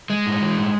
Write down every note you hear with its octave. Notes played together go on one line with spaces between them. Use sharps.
G#3
A2
E3
A2